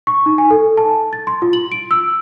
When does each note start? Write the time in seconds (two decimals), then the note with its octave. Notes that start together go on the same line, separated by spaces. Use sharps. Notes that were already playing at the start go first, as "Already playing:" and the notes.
0.07 C#6
0.26 D#4
0.38 G#5
0.50 A4
0.77 A5
1.13 A6
1.27 C6
1.42 F4
1.53 F#7
1.72 D7
1.91 E6